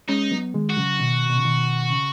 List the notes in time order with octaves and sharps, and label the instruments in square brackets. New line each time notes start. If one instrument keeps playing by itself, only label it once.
[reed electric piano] G#3 C#4 [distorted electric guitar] D#4
[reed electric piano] F#3 B3
D#3 G#3
[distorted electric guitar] F#4
[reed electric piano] C#3 F#3
B2 D#3
B2
C#3
B2 D#3
C#3